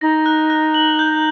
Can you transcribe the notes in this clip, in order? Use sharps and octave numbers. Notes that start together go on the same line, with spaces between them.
D#4 A#6
F#6
F#6
F#7
G6